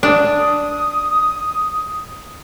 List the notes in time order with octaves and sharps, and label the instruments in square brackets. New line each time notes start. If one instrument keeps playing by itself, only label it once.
[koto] D4 [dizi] D#6